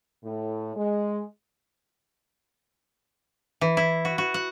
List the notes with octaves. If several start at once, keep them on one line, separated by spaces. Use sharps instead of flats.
A2
G#3
E3
E4
F#4
F#4
F#5